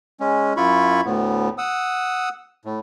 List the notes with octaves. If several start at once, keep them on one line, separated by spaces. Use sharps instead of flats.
G#3 C#4
F#2 E4 F4 B5 C#6
D2 A2 B3
F#5 D#6 E6
A2